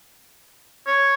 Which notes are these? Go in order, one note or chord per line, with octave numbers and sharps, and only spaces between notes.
C#5